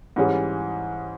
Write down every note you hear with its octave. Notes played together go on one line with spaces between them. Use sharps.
G#2 E3 G3 C#4 G#4